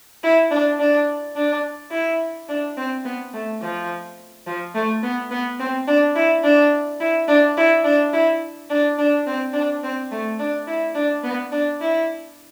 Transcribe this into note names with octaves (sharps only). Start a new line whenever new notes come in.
E4
D4
D4
D4
E4
D4
C4
B3
A3
F3
F3
A3
B3
B3
C4
D4
E4
D4
E4
D4
E4
D4
E4
D4
D4
C4
D4
C4
A3
D4
E4
D4
B3
D4
E4